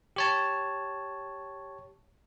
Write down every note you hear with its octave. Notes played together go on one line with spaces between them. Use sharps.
G4 C#5 A5